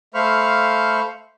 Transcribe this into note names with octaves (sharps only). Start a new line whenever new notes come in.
A3 C5 F5 B5 C#6 F6